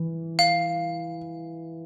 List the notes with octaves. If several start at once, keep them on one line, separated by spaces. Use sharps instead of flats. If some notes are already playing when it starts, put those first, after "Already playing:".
Already playing: E3
F5